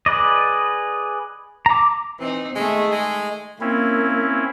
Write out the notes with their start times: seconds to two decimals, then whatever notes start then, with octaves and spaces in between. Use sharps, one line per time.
0.06 G#4 B4 D5 D#5
1.66 A#5 D6
2.19 E3 C4 D#4
2.55 D#3 G#3 A3 G#4
2.92 G#3
3.61 A#3 C4 C#4 E4